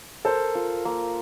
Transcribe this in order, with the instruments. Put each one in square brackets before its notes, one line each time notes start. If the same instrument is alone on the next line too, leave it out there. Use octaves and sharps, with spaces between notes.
[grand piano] A4 C5 [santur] A#4
[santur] F4
A#3